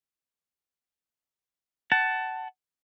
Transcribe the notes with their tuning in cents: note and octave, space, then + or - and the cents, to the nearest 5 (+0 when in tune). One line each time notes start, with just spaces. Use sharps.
F#5 +20 A5 +0